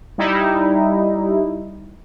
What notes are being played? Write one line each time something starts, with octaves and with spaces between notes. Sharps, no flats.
G3 D#4 E4